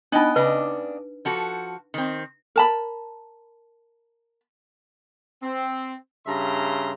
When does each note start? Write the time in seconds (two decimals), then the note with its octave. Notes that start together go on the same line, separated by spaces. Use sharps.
0.12 B3 D4 D#4 D#5 G5
0.36 C#3 D4 B4 D#5
1.25 F3 F#4 A4
1.94 D#3 C4
2.56 A#4 A5 B5
5.42 C4
6.26 G2 C#3 E5 A#5 C6